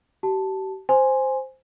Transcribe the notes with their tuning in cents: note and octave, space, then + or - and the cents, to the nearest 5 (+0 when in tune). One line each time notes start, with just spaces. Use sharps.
G4 -40 A5 +0
C5 +0 G#5 +0 C6 +0